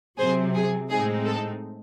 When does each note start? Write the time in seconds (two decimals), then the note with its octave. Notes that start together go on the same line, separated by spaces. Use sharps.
0.18 C3 F#3 C4 G#4 C5
0.54 G#4
0.89 A2 G#3 C4 D#4 G#4
1.26 A4